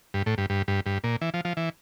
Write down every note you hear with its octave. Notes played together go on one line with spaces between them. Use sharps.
G2
A2
G2
G2
G2
G2
A#2
E3
F3
F3
E3